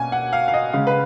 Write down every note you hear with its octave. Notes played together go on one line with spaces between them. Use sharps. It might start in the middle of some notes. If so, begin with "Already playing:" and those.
Already playing: B2 A#3 C#4 G#5
F#5
F5
F5
D#5
C#3 G#3 C#4 F5
B4